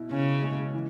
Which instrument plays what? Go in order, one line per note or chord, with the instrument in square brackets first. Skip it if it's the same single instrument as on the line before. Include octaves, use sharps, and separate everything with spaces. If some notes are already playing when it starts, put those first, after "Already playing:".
Already playing: [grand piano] B2 E4
[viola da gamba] C#3 [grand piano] C#4
[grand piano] G#3
E3